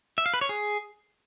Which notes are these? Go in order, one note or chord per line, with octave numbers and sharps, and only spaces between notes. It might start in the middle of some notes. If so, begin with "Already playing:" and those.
E5
F5
B4
C#5
G#4